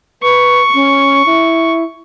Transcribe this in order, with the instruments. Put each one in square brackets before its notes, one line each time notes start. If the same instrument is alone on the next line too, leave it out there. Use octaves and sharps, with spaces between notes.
[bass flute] B4 [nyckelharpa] C#6
[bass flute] C#4
E4